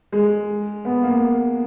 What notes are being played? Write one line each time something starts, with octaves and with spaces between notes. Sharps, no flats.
G#3
B3
A#3